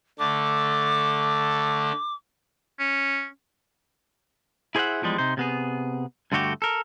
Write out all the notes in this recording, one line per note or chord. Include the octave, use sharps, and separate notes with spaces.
D3 A3 D6
C#4
E4 G#4 C5 D5 E5 F#5
E2 F3 G3 G#3
C3 D#4 C5
C3 B3 G#4
G2 D3 A3 F#4 G4
A4 A#4